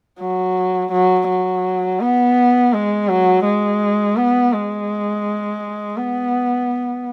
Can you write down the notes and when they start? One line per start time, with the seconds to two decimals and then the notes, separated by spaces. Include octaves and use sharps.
0.20 F#3
0.92 F#3
1.29 F#3
2.01 B3
2.73 G#3
3.09 F#3
3.45 G#3
4.17 B3
4.53 G#3
5.97 B3